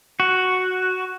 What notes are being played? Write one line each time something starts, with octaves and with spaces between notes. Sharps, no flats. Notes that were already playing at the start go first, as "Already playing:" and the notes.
F#4